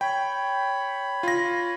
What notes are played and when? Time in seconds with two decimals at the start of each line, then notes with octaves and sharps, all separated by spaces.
0.01 C#5 G5 B5
1.23 F4 A#6